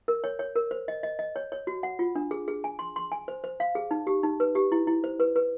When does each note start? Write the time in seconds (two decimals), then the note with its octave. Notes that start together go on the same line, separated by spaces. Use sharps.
0.08 A#4
0.24 C#5
0.39 C#5
0.55 A#4
0.71 C5
0.88 D#5
1.03 D#5
1.19 D#5
1.36 C#5
1.52 C#5
1.67 F#4
1.83 F#5
1.99 F4
2.15 D4
2.31 G#4
2.48 G#4
2.64 G#5
2.79 C6
2.96 C6
3.12 G#5
3.28 C5
3.44 C5
3.60 F5
3.75 G#4
3.91 D#4
4.07 G4
4.23 D#4
4.40 B4
4.55 G4
4.72 E4
4.87 E4
5.04 C5
5.20 B4
5.36 B4